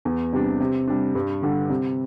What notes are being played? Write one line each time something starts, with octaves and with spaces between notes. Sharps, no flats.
E2
C3 G3 D4
C3
G3 D4
G2
D3 G3 D4
C3